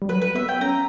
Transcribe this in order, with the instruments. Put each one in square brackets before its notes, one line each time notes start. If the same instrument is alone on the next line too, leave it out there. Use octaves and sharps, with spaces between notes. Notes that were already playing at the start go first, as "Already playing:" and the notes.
[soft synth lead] G3
[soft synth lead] F#3 [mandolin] B4
[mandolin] B4
[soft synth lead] B3 [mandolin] E5
[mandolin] G5
[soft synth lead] C#4 [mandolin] A#5